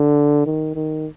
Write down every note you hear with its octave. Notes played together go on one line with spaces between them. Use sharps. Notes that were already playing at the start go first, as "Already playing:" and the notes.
Already playing: D3
D#3
D#3